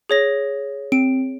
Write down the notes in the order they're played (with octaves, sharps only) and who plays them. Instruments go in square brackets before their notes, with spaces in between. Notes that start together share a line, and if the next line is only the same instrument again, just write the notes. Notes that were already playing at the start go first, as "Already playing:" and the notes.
[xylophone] G#4 C#5 A#6
[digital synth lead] C4 [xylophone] D7